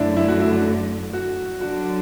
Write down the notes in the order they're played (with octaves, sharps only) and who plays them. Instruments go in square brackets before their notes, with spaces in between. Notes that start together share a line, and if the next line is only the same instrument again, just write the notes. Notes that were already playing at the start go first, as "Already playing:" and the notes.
Already playing: [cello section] F#2 D3 A3 [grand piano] D4 E4
[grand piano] E4
F#4
E4
F#4
[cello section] D3 F#3 D4 [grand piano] F#4